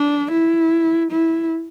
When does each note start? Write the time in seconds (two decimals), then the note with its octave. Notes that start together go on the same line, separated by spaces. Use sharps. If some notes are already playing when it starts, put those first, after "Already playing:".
Already playing: D4
0.31 E4
1.11 E4